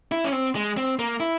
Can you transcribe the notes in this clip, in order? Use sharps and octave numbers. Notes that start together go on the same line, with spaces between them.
E4
C#4
C4
G#3
C4
A#3
E4